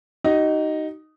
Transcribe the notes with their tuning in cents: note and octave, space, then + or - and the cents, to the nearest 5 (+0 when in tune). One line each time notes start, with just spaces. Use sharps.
D#4 +0 F#4 +45 D#5 +0